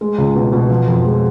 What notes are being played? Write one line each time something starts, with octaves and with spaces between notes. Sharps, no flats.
G#3
C#2
B2
B2
F3
F2
G#3